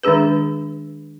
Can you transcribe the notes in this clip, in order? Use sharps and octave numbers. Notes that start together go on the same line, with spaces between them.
D#3 G#3 D4 G#4 B4